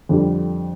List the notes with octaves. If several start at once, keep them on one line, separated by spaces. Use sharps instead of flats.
F2 D3 G3